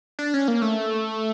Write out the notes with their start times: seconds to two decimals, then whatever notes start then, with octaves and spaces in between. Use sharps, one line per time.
0.19 D4
0.34 C#4
0.48 A#3
0.62 A3